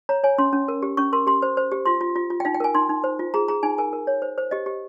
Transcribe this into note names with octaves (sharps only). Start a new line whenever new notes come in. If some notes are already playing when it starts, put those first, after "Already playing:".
C#5 A#5
C#5 G#5
C#4 C6
C#4
A#4
G4
C#4 C#6
A#4 C6
G4 C6
C5
C5
G4
F4 C6
F4
F4
F4
G5
D#4 F5
G5
A#4 G#5
D#4 C6
D#4
C5
F4
G#4 A#5
G#4 A#5
D#4 G#5
A#4 G#5
A#4
C#5
C5
C5
G4 D#5
G4